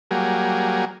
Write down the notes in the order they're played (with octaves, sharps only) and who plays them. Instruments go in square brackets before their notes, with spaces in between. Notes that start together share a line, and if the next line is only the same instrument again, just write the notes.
[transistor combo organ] F#3 G3 A#3 G#4